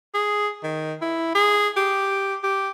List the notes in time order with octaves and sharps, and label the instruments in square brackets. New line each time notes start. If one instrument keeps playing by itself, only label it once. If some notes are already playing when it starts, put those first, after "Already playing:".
[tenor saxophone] G#4
D#3
E4
G#4
G4
G4